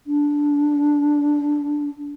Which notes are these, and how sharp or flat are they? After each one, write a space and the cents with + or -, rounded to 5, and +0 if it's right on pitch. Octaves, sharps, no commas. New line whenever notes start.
D4 -10